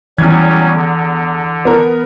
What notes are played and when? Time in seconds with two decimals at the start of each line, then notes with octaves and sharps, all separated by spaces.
0.18 E2 E3 F#3 G3 C#4 G#6
0.75 D3
1.65 B3 A#4